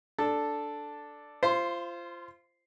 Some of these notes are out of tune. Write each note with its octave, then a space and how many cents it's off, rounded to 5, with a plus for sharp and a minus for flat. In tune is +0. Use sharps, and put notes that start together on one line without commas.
D4 +0 A4 +0
F4 -25 C5 +0 C6 -30